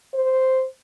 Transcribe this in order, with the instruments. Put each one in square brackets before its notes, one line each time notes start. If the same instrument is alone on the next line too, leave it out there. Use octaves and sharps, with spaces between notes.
[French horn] C5